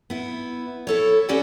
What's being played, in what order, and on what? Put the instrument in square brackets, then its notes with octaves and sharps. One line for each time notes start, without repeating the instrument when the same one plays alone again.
[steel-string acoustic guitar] B3 E4
E4 A4 C#5
C#4 F#4 G4 B4 D5 F#5